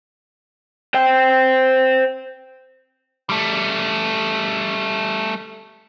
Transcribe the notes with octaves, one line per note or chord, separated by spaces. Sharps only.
C5 G5
G3 A3